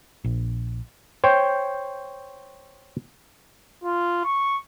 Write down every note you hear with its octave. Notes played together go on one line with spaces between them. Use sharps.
A#1
C5 C#5 G5
F4
C#6